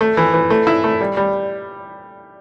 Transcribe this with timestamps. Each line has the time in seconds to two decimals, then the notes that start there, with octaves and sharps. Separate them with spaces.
0.01 A3
0.17 E3
0.34 E3
0.50 A3
0.67 E4
0.84 A3
1.01 G3
1.17 G3